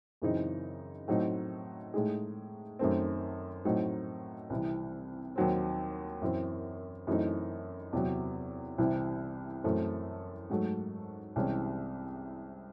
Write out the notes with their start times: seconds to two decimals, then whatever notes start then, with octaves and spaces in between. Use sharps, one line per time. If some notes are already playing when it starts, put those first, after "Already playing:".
0.22 F#2 C#3 E3 C4 D#4
1.08 A2 F#3 C4 D#4
1.94 A2 G#3 D#4 G#4
2.79 F#2 D#3 A3 C4
3.65 A2 F#3 C4 D#4
4.50 C2 C3 E3
5.36 D#2 D#3 F#3 C4
6.22 F#2 E3 C4
7.07 F#2 E3 A3 C4 D#4
7.93 E2 C3 F#3
8.78 C2 C3 E3 C4 E4
9.64 F#2 E3 A3 C4
10.50 G#2 F#3 A3
11.36 C2 C3 E3 G#3 C#4